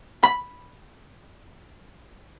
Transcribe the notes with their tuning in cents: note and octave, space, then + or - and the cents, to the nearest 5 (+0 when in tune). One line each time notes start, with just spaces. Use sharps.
B5 -5